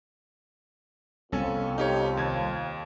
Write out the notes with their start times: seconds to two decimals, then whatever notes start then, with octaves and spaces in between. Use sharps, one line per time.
1.32 C2 F2 B3 C#4 A4 G#5
1.78 D#4 G4 C#5
2.17 D#2 G#6